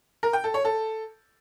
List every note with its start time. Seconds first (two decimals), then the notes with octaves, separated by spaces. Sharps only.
0.23 A#4
0.33 G5
0.44 A4
0.54 C#5
0.65 A4